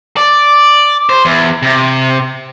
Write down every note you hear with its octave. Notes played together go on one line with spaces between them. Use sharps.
D5
C5
E2
C3